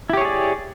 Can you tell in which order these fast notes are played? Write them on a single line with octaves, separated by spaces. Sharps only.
E4 G4 C#5 G#4 D5